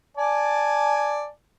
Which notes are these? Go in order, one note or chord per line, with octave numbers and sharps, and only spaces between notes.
D5 G#5 A5